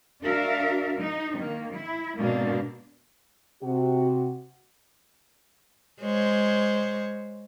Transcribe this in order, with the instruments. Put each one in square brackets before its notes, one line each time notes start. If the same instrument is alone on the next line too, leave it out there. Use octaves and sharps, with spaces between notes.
[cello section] D4 F#4 A#4 E5 F5
D#4
D#3 A#3
E4
G#2 B2 A#3 C4 D4
[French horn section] C3 F#4
[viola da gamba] G#3 C5 C#5